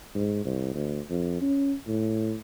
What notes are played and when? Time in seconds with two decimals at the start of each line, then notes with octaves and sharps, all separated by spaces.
0.15 G#2
0.45 C2
0.74 D2
1.10 F2
1.41 C#4
1.87 A2